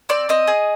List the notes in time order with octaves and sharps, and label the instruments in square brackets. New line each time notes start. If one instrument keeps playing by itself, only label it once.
[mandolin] C4 D5
C4 D#5
G#4